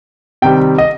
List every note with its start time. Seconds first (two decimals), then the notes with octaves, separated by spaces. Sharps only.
0.42 C3 D#3 G3 G5
0.78 D#5